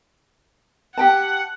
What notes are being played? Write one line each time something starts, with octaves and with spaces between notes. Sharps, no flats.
G4 F#5 G5 A5